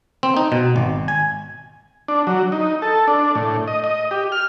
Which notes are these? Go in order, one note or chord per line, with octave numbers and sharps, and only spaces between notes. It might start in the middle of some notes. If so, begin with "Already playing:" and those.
C4
D#4
B2
G#1
G#5
D4
F#3
D#4
A4
D4
A2
D#5
D#5
G4
F6